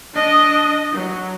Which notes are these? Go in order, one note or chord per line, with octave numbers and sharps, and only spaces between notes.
D4 D#5
F#3